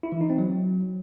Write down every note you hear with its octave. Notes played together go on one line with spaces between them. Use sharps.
E4
E3
D#4
C4
F#3